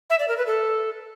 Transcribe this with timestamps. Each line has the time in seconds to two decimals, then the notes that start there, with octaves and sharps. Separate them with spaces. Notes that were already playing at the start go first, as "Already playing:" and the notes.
0.10 E5
0.19 D5
0.28 A#4
0.37 B4
0.46 A4